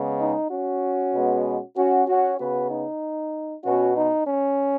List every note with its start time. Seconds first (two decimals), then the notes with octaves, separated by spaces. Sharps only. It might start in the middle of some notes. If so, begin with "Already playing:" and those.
Already playing: C#3 G#3 B3
0.20 D#4
0.51 C#4 F#4
1.14 B2 G#3 B3
1.77 C#4 F#4
2.07 C#4 F#4
2.39 C#3 B3 F#4 B4
2.70 D#4
3.64 B2 B3 C#4 F#4
3.96 D#4
4.27 C#4